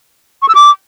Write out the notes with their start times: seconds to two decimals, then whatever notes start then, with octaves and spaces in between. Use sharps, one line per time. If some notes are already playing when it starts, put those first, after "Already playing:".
0.42 C#6
0.49 E6
0.55 D6